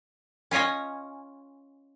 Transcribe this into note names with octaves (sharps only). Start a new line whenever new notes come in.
C#4 F4 C#5 D#5 G#5